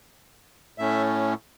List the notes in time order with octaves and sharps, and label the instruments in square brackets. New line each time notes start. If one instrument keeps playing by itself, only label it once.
[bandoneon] A2 A3 C#4 E5